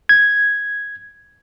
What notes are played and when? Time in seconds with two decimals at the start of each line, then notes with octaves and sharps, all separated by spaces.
0.09 G#6